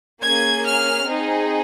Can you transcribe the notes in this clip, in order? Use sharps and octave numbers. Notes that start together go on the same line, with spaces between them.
A#3 C#4 G#4 G#6
F6
C4 D#4 G#4